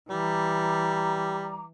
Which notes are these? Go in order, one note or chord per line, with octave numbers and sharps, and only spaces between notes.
E3 G3 A#5 D6